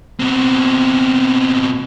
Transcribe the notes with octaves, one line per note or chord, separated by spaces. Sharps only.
B2 C4